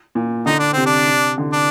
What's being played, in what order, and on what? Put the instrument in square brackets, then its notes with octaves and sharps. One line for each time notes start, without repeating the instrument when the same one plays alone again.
[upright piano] A#2
[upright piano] D3 [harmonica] D#4
[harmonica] D4
[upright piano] C3 [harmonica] C4
[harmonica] D4
[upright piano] C3
D3
[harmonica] D4